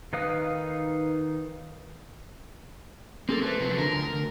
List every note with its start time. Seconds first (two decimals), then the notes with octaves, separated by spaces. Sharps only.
0.13 D#3 D#4 B4 F5 D#6
3.29 A#3 C4 G#4 A4
3.42 A3 B4 C5
3.60 C3 F3 F#3
3.78 D3 A#4
3.92 D2
4.13 D2